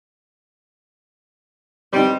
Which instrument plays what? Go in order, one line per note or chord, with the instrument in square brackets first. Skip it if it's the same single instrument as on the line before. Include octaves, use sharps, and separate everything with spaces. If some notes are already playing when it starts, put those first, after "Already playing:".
[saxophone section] G3 [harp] C4 D#4